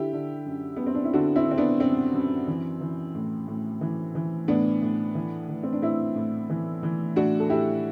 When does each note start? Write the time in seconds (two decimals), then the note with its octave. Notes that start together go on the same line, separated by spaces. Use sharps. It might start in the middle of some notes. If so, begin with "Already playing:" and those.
Already playing: D3 E4 G4
0.13 D3
0.46 F#2
0.76 F#2 B3
0.86 C4
0.95 D4
1.05 E4
1.13 D3 D4 F#4
1.36 C4 E4
1.46 D3 C4
1.58 B3 D4
1.80 F#2 C4
2.14 F#2
2.48 E3
2.81 E3
3.15 A2
3.48 A2
3.81 E3
4.15 E3
4.48 A2 B3 D4
4.82 A2
5.15 E3
5.49 E3
5.63 C4
5.73 D4
5.82 A2 C4 E4
6.15 A2
6.50 E3
6.83 E3
7.16 A2 D4 F#4
7.39 A4
7.50 A2 E4 G4